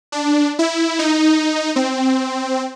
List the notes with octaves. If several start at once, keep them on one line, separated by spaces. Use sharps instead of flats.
D4
E4
D#4
C4